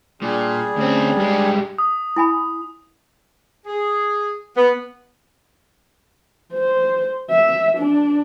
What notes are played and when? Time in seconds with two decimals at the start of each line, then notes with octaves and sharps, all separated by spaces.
0.22 A#2 G3 D4 G#4
0.76 D2 C4 C#4 G4
1.16 G2 G#3 G4
1.78 D#6
2.16 E4 G#5 B5
3.66 G#4
4.56 B3
6.53 C5
7.31 E5
7.78 D4